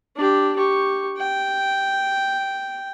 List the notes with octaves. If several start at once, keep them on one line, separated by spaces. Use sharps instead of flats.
D4 G4
G4 C#6
G5